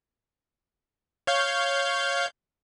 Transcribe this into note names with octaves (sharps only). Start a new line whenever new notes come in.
C#5 F5 G6